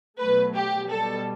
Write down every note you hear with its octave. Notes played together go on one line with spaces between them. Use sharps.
B2 F#3 A3 B4
G4
B2 G3 A4